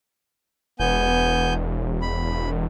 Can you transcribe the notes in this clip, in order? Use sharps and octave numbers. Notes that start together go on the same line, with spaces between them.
E1 B3 G#5 G6
B5